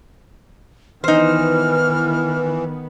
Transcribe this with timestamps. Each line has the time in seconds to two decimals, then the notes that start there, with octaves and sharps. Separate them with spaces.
1.04 D#3 E3 B3 D#4 C5 F6